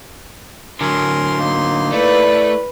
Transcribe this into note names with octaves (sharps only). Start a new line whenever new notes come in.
D3 F#3 A#4 G#5 C6
A#3 D#4
A3 E4 B4 D5